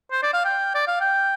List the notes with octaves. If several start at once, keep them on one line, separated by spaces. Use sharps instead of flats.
C5
D5
F5
G5
D5
F5
G5